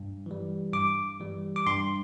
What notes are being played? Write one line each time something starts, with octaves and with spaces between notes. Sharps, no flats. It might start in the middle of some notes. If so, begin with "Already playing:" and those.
Already playing: G2
E3 G3
G2 D6
E3 G3
D6
G2 C6